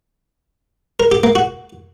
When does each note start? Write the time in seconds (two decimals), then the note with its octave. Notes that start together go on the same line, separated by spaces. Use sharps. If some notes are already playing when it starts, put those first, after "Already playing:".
1.00 A#4
1.12 G4
1.23 A#3
1.35 F#4